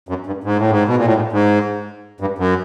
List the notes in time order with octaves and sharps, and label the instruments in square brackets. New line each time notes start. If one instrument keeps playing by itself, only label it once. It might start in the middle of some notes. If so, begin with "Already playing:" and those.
[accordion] F#2
G2
G#2
A2
G#2
B2
A#2
A2
G#2
G#2
G2
F#2